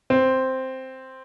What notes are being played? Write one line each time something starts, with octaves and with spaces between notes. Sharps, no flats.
C4